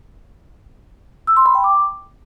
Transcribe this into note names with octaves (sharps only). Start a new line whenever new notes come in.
E6
C6
B5
G5
D6